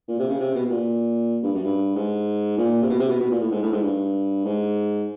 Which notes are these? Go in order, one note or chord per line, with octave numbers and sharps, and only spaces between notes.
A#2
C3
C#3
C3
B2
B2
A#2
G2
F#2
G2
G#2
A#2
C3
B2
C3
B2
B2
A#2
A2
G#2
A2
G#2
G2
G#2